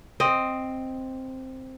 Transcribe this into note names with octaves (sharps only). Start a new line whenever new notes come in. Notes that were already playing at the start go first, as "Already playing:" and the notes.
C4 D#5